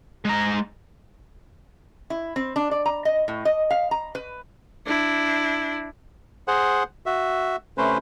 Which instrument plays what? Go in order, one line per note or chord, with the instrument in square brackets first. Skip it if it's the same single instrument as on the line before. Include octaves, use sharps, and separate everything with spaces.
[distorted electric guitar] G#3 A#5
[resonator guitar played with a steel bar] E4
C4
D4
D5
A#5
D#5
A2
D#5
F5
A#5
B4
[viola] D4 E4
[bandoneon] G#4 C5 F#5
F#4 E5
C3 A3 C#4 B4 C5